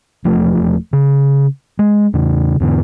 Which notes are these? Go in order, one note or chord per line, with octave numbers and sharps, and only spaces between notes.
E1 F3 A3
C#3
G#3
E2 C#3
E2 G#2 D3 B3